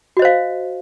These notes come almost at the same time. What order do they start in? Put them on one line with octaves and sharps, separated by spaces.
F#4 D#5 C5 F5